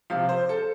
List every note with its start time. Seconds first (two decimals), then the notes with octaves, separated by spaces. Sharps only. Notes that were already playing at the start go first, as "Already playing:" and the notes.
0.10 C3 F3 F5
0.29 C5
0.49 A4